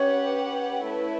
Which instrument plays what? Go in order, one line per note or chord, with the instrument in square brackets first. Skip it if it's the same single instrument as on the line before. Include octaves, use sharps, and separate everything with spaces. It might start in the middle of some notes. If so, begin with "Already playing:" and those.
Already playing: [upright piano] C#4 C#5 [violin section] G4 B4 F#5
[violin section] A3 E4 B4